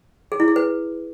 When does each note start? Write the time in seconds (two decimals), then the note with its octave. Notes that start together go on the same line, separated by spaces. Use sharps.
0.32 G#4
0.40 E4
0.48 G#4
0.56 B4